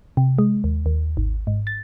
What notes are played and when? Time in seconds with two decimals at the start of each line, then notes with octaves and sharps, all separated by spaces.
0.17 C3
0.39 G#3
0.64 D#2
0.86 D#2
1.17 G#1
1.47 G#2
1.67 A6